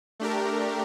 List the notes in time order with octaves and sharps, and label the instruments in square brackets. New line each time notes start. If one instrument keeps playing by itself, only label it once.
[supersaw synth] A3 D4 G4 A#4